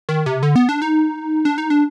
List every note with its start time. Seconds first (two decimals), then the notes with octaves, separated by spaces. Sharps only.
0.09 D#3
0.26 C3
0.43 D3
0.56 B3
0.69 D4
0.82 D#4
1.45 D4
1.58 D#4
1.70 D4